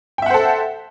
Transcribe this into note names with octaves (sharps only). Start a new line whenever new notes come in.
A4 C5 E5 F#5 G5